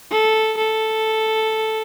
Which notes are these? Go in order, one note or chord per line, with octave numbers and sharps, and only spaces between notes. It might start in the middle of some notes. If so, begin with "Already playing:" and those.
A4
A4